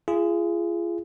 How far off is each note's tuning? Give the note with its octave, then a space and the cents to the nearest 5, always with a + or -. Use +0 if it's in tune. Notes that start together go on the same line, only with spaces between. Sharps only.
F4 -35 G#4 +0